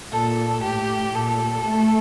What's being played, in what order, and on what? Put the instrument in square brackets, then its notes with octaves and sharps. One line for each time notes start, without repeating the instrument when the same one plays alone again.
[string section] A#2 [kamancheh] A4
[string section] A2 [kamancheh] G4
[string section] A#2 [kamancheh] A4
[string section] A3